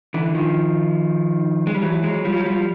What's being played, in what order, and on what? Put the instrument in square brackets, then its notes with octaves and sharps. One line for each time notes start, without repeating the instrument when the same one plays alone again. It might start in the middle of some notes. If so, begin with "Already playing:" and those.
[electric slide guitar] D3 E3
D#3 F3
G#3
G3
E3 F#3
F#3 G#3
F3 G3
F#3
F3 G3